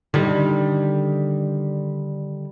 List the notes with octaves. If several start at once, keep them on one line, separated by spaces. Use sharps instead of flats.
D3 D#3 G3